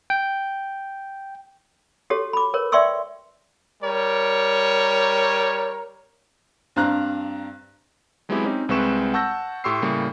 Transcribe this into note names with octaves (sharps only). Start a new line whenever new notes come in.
G5
F#4 G4 A4 C#5
B5 D6
A#4 B4 C#5
D5 E5 G5 C6 C#6 E6
G3 A#4 C#5
G2 C4 D4 F5 A#5 F#6
F#3 G#3 B3 C4 E4 G4
C4 C#4 D#4 G4
C2 G#3 C4 B4 C#6 E7
F#5 A5 C#6 E6 G6 A#6
A2 G4 C6 C#6 E6 C7
A2 C#3 G3 A#3